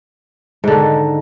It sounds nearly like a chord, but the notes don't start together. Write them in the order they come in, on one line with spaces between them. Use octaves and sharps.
G#2 D3 D#3